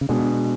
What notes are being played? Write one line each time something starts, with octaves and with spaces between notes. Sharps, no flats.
C#3
B2 G#3 D4 G#4